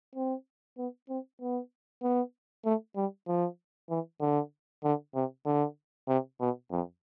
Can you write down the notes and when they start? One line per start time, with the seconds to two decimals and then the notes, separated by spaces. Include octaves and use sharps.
0.15 C4
0.78 B3
1.09 C4
1.41 B3
2.03 B3
2.65 A3
2.96 G3
3.27 F3
3.90 E3
4.21 D3
4.84 D3
5.15 C3
5.46 D3
6.08 C3
6.40 B2
6.71 F2